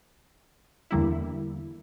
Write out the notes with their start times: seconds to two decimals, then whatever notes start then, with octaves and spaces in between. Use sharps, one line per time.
0.91 E2 D3 G3 A#3 E4